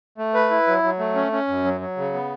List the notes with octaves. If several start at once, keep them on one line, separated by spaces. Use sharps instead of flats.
A3
B4
E4
F#3
F#3
A3
C#4
C#4
F#2
F#3
F#3
C#3
B3